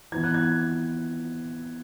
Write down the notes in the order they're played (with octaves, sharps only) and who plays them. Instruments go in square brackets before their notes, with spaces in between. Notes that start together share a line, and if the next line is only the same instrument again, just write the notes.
[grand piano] E3 B3 G#6
F#6
G#6